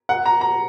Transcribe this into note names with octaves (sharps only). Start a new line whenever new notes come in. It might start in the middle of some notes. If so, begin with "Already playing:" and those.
F#5
A#5
A#5